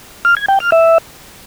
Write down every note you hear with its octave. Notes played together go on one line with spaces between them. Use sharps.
F6
G#6
G5
F6
E5